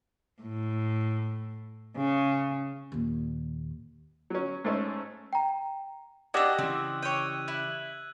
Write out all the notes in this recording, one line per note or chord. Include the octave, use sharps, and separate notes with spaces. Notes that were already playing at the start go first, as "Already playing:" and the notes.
A2
C#3
D#2 A#2
F#3 C#4
G#2 A3 C#4
G5 A#5
D4 F#4 G4 D5 D#5 E6 F#6 G#6
C#3 E3 C4
C#5 G5 D#7
E4 F#6 F#7